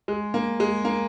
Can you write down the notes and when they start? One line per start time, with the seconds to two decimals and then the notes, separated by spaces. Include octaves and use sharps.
0.08 G#3
0.34 A#3
0.60 G#3
0.85 A#3